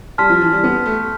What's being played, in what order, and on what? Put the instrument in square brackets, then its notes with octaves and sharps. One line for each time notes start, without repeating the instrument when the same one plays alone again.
[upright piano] G3 [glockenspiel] A5 C6 F6 B6
[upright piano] F3
E3
G3
B3
A3